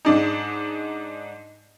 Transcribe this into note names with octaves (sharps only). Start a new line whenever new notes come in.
G#2 D4 D#4